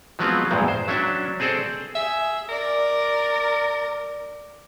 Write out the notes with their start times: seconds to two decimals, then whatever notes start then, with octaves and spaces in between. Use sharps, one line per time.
0.19 F3 F#3 G#3 B3 C4 F4
0.51 E2 G2 A#2 G#3
0.68 C5
0.88 F#3 C#4 D4 E5
1.40 C4 G#4 A4 C5 D5
1.95 G#4 E5
2.49 A#4 D5